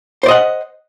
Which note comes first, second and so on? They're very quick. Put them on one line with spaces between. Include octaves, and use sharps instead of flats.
C5 D5 D#5 F#5